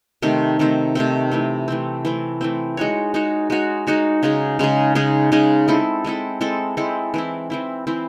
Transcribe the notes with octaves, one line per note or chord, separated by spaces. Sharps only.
C3 D#3 A3 C4
C3 D#3 A3 C4
C3 D#3 A3 C4
E3 A3 C4
E3 A3 C4
E3 A3 C4
E3 A3 C4
G#3 D#4 F#4 C#5
G#3 D#4 F#4 C#5
G#3 D#4 F#4 C#5
G#3 D#4 F#4 C#5
C#3 G#3 D#4 G#4
C#3 G#3 D#4 G#4
C#3 G#3 D#4 G#4
C#3 G#3 D#4 G#4
G#3 C4 E4 A4
G#3 C4 E4 A4
G#3 C4 E4 A4
G#3 C4 E4 A4
E3 C4 E4
E3 C4 E4
E3 C4 E4